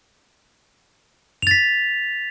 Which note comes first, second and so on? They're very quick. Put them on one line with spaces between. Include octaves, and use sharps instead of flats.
F7 A6 B6